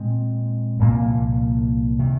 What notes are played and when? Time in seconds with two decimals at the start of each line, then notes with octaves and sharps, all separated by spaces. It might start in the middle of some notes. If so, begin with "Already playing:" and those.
Already playing: A#2 G#3 C4
0.79 C2 A#2 F3 A#3
1.99 C3 D#3